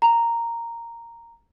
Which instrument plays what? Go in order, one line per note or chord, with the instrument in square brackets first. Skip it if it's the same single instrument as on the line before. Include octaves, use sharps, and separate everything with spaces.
[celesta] A#5